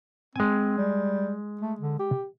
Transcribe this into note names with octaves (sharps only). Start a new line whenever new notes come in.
G#3 C4 G#5
G3
A3
D3
G4